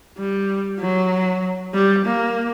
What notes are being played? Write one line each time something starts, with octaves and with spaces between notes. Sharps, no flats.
G3
F#3
G3
A#3